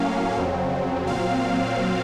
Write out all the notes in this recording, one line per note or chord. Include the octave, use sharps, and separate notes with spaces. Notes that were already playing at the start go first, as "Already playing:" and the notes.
Already playing: A2 F#3 A#3 C#4 F5
F2 C#3 F#3 C4
A#2 F#3 C4 F5